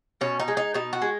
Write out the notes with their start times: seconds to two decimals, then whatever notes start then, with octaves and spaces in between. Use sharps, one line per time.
0.21 B2 C#4
0.39 D#4
0.48 G#3
0.57 D#4
0.74 B2 D#4
0.93 F#4
1.02 G#3